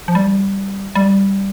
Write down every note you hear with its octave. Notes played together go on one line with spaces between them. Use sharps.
F3
G3
G3